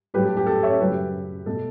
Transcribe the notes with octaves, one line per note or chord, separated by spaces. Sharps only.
A2 F#3 A3 G4 B4
A4
G4
A4
C#5 E5
F#2 C#3 F#3 A3 G4 B4
B2 A3 A4